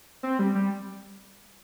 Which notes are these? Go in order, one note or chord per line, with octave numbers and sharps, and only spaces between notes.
C4
G3
G3